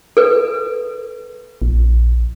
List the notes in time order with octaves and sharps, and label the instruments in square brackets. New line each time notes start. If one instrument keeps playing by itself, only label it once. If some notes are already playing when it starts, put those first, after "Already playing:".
[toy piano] A4 B4
[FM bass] A#1